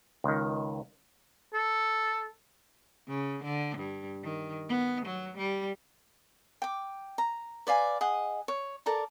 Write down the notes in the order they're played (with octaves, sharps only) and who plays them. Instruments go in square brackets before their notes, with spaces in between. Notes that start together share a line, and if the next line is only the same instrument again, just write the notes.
[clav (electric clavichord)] C#2 D#3
[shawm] A4
[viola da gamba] C#3
D3
G2
D#3
B3
F#3
G3
[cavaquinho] G5 D6
A#5
B4 D5 F5 G#5
G#4 D#5 F#5
C#5
A4 A#4 D5 A#5